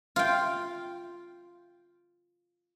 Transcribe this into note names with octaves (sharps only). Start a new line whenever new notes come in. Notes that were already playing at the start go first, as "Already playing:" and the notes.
F4 G5